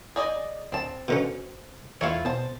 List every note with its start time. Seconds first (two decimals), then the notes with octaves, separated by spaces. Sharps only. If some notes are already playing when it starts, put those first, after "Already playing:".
0.16 G#4 D5 D#5
0.72 D1 C4 A5
1.08 B2 D3 C#4
2.01 E2 A3 E4 F4 C#5 F5
2.25 B2 C5 A5